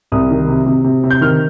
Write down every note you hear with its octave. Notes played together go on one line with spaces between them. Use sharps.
C2 D#6
D#3
C3
C3
C3
C3
G6
D#3 F6